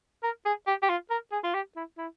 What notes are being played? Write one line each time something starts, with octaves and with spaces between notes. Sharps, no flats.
A#4
G#4
G4
G4
F4
A#4
G#4
F4
G4
E4
E4